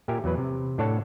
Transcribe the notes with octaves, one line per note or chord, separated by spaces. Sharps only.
A#2 G4 A#4 E5 G#5
E2 F#3 B4
C3
A2 D4 A4 C#5 F#5 A5